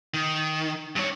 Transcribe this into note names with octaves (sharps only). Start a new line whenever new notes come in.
D#3
G2 C#5